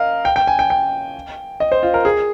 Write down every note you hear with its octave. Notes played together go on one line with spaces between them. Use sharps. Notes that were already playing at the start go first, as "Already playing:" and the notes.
Already playing: A#4 D#5 F5
G5
G5
G#5
G5
G5
D#5
C5
F4
A#4
G#4